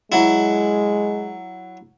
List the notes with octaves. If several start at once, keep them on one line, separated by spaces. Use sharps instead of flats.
F#3 G#3 E4